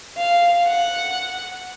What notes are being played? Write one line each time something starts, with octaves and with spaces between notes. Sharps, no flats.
F5
F#5